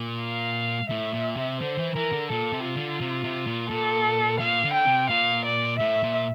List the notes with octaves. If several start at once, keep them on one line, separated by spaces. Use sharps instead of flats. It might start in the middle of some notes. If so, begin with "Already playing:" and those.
Already playing: A#2
F5
A2 E5
A#2
C3
D3 C5
E3
E3 A#4
D3
A#2 A4
C3
F4
D3
C3
C3
A#2
A#2 A4
A#2 F5
D3
G5
C3
A#2 F5
D5
A2 E5
A#2